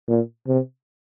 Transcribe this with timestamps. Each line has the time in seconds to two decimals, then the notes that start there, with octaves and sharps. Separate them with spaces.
0.09 A#2
0.48 C3